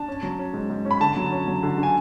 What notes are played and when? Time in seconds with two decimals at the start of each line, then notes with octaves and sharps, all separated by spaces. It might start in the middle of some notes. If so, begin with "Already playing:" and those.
Already playing: D4 A5
0.08 C#4
0.23 F#3
0.39 C#4
0.54 G#2
0.70 G#2
0.85 C#4
0.91 B5
1.00 D3 A5
1.17 F#3
1.32 C#4
1.47 F#3
1.63 D3
1.78 D3
1.83 G#5